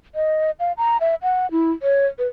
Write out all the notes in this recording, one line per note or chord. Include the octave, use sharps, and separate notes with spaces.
D#5
F5
A#5
E5
F#5
E4
C#5
B4